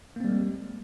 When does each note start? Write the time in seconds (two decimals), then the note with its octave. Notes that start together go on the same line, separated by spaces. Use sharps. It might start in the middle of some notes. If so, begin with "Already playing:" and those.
0.16 A#3
0.20 C4
0.24 G3
0.29 G#3